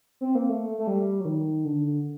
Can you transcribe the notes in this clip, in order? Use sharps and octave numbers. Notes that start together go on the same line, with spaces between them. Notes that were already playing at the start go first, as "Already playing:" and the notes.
C4
A#3
A3
A3
G3
F#3
D#3
D3